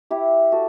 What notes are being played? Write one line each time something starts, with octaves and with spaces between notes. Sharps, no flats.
E4 G4
F#4 A4